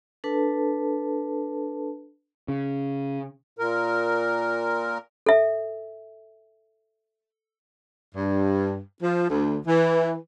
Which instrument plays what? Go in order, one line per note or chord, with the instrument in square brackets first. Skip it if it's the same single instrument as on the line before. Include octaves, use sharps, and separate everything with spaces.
[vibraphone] D4 A4 B4 A5
[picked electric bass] C#3
[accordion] A#2 A#4
[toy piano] A4 E5
[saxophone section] G2
F3
D2
E3